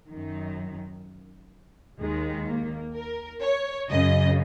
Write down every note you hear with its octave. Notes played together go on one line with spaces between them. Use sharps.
F#2 D#3
D#2 D#3 G#3
A#3
A#4
C#5
F#2 C#3 D#5